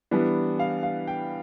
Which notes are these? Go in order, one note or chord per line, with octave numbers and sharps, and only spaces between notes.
E3 G3 B3 D4
F5
F5
G5